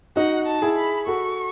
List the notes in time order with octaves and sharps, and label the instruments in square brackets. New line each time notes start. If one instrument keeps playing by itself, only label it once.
[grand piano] D#4 F#4 [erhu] F#5
[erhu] A5
[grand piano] E4 G#4
[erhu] B5
[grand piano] F#4 A4 [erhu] C#6